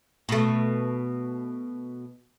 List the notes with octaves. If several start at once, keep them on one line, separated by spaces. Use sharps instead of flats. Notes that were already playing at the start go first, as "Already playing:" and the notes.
B2 A3